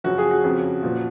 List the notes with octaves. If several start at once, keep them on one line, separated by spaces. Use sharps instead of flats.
F#2 C#3 F3 F#4
G#4
F#4
F2 C#3 F3
A#2 F3